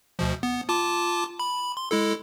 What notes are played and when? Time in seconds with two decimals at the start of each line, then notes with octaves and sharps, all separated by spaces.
0.19 D2 B2 F3
0.43 B3
0.69 F4 A5 D6
1.39 B5
1.77 C6
1.91 G#3 E4 A4